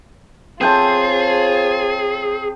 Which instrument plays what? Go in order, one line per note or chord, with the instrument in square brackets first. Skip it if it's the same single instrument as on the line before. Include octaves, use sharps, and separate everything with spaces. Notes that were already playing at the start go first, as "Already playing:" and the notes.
[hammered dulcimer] C4 C5 A5 [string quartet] F4 C#5 [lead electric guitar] G#4